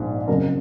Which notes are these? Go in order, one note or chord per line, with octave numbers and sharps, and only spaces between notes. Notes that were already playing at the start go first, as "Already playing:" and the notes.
Already playing: A#1 G#2 F3
F#1 F2 C#3 F#3 A#4